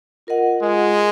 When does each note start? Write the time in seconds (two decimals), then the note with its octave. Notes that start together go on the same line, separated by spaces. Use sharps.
0.27 F4 A#4 D#5 F#5
0.62 G#3 F4 A#4 D#5 F#5